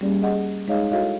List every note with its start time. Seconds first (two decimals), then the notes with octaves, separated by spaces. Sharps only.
0.01 G3 A#3 C#4 G4 G#4 D5
0.22 G#4 D#5 F#5
0.68 G#3 D#4 G#4 C#5 D#5 F5
0.91 E4 F#4 A4 C#5 D#5 F5